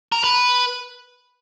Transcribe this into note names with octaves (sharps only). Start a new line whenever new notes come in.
A#4
B4